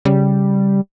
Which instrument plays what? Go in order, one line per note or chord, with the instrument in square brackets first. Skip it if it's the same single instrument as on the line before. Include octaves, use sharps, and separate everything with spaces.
[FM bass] C#3 [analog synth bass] G3